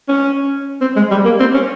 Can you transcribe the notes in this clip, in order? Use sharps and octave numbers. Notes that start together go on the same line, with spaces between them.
C#4
C4
G#3
G3
A#3
C4
C#4